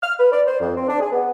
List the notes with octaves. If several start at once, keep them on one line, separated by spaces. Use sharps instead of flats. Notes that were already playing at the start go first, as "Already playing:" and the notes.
F6
B4
D5
C5
F2
C4
D4
G#4
B3